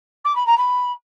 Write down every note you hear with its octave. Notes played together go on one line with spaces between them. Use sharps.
D6
B5
A#5
B5